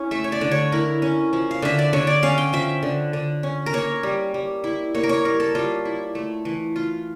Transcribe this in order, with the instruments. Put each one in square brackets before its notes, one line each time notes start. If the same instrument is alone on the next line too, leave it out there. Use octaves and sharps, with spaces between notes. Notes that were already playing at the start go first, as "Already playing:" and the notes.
Already playing: [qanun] C#4 E4
A3 E5
C#5
D5
D3
C#5
E4 A#4
C#4
F3
F5
D3 E5
D5
D3 C#5
D5
C#4 F5
G5
F3 E5
D3
D3
C#4
A#4
A#3 C#5
G3
G3
E4
A#3 C#5
A#4
C#5
G3 A#4
A4
G3 F4
E4
A3
E3
F4